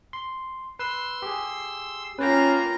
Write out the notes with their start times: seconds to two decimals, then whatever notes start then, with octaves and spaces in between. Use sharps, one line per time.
0.13 C6
0.79 B4 C6 E6
1.22 G4 G#4
2.19 A#3 C#4 F4 B4 G5 A#5